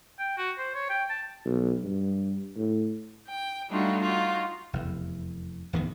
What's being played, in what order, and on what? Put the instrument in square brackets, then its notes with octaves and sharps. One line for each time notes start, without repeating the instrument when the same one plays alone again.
[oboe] G5
F#4
C5
C#5
G5
A5
[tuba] B1
G2
A2
[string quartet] G5
G3 A3 D4 D#4 F4 F#4
D#4 F4 F#4
[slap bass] F1 E2
D1 E2 D#3